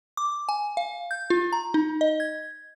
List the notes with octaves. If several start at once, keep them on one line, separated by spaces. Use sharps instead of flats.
D6
G#5
F5
G6
F4
A#5
D#4
D#5
G#6